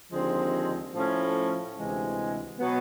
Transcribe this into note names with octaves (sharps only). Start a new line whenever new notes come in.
D#2 D3 F3 G#3 C4
A2 F3 A3 C#4
D2 C3 E3 G#3
B2 F#3 B3